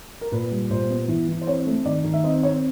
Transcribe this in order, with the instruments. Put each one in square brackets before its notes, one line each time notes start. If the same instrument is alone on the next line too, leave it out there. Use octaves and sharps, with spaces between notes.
[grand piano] A#4
A#2 B4
G3
A#2 C5
B3
E3
E3
C5
C4 C#5
A3
D#3 D5
D#3
E5
C4 D#5
C4 C#5